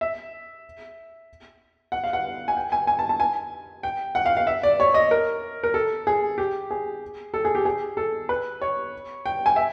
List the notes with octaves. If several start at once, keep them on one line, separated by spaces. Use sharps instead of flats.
E5
F#5
F5
F#5
G#5
G5
G#5
G#5
A5
A5
G#5
G5
F#5
F5
F5
E5
D5
C#5
D#5
A#4
A#4
A4
G#4
G4
G#4
A4
G#4
G4
G#4
A4
B4
C#5
G5
G#5
E5